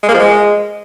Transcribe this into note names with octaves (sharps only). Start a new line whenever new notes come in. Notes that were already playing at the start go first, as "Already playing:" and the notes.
G#3
A#3
F3
G#3